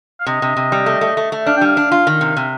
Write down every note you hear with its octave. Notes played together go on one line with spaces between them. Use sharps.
F5
C3 D#5
C3
C3
G3
A3
A3
A3
A3
D4 F5
G5
G3 F5
D4
F4
D#3
C3
C3